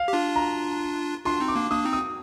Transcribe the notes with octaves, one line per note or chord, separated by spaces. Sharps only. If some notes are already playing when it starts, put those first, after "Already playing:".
Already playing: F5
G4
D4 F4
A#5
D4 F4 C6
C4 D#4
D6
A#3 D4
A#3 D4 D#6
C4 D#4
D#6